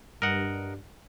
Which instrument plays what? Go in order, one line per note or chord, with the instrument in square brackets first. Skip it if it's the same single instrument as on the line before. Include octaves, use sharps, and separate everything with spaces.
[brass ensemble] G2 [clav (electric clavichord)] A#4 D#5 F#5